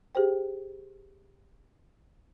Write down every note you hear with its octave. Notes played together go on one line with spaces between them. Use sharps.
G4 G#4 C5 G5